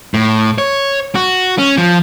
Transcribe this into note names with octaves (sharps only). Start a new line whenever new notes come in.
A2
C#5
F#4
C#4
F3